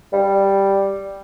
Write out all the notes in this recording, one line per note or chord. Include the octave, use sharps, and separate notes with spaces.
G3